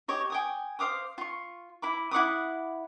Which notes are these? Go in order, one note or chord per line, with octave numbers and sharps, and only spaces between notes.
G4 C#5 D#5
G5 G#5 D#6
C5 F5 D6 D#6
F4 C#6
E4 B5 D6
E4 F#5 D6 D#6